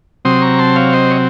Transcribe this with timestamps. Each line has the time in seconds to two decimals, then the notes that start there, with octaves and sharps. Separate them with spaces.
0.25 C3 F#3 C4 C6 D#6
0.42 A#5 C#6
0.59 A5 C6
0.76 C#5 F5
0.93 C5 D#5
1.11 C#5